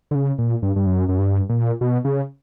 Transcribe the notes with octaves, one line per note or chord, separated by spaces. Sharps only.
D3
C#3
A#2
G2
G2
F#2
F#2
G2
A#2
B2
C#3